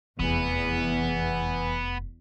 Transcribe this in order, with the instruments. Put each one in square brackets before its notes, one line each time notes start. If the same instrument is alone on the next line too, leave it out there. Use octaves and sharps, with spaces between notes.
[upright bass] F1 [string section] E2 [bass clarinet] E3 [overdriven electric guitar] B3